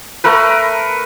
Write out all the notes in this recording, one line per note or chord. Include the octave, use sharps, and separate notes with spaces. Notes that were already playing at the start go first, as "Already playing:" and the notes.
A3 A#4 B4